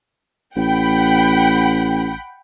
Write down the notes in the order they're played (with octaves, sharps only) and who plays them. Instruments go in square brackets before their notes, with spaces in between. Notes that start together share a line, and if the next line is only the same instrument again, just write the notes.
[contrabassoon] A1 [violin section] F#5 G5 B5